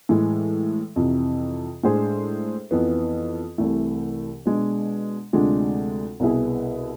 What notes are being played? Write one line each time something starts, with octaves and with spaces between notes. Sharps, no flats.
A2 E3 G#3
F2 C3 E3
A2 G#3 D4 G#4 C5
F2 E3 B3
C2 C3 E3 A3
B2 G#3 D4
D2 C3 F3 G#3 D4
C2 B2 B3 E4 G#4